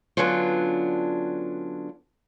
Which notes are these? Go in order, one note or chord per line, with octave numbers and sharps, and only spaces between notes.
D3 F#3 B3 C#4 D4 F4